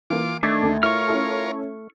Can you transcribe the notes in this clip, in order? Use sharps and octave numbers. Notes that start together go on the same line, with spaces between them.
E3 A#3 F4 D6
D#3 A3 D4 D6 G#6 A6
D2
E4 F4 A#4 C#5 C#6 F6
C#4 E4 A4